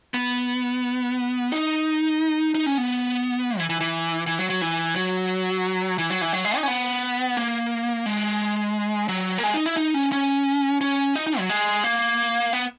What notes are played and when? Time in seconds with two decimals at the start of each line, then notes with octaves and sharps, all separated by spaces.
0.14 B3
1.52 D#4
2.55 D#4
2.66 C#4
2.78 B3
3.58 E3
3.70 E3
3.81 E3
4.27 E3
4.39 F#3
4.50 F#3
4.61 E3
4.96 F#3
5.98 E3
6.10 F#3
6.21 E3
6.33 F#3
6.45 G#3
6.57 D#4
6.63 C#4
6.68 B3
7.37 A#3
8.06 G#3
9.08 F#3
9.38 A#3
9.44 G#3
9.54 D#4
9.66 E4
9.77 D#4
9.94 C#4
10.12 C#4
10.81 C#4
11.16 D#4
11.27 D#4
11.38 F#3
11.49 G#3
11.84 A#3
12.53 B3